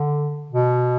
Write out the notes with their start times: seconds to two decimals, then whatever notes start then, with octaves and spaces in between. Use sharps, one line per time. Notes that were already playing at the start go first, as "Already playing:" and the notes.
Already playing: D3
0.51 B2